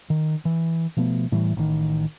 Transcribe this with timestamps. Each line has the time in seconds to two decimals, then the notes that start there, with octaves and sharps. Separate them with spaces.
0.10 D#3
0.45 E3
0.97 B2 F3 A3 B3
1.32 A2 E3 G3
1.57 A1 D#3